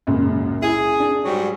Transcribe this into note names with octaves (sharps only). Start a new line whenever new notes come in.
C#2 F#2 A#2
E4 G#4
D4
G#2 F#3 G3